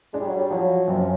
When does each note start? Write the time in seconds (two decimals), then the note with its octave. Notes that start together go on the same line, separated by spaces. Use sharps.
0.13 G#3 D4
0.20 G3
0.28 F#3
0.36 G3
0.51 F3 F#3
0.88 F#2 C4
0.98 C#4